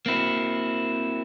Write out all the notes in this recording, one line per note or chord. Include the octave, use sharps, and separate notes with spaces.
A#3 C4 E4 F#4